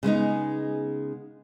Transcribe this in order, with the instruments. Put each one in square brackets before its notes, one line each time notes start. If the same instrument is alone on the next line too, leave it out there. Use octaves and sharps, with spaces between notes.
[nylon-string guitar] C#3 G#3 B3 D#4